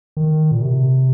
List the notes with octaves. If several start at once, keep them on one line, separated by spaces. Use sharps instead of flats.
D#3
A#2
C3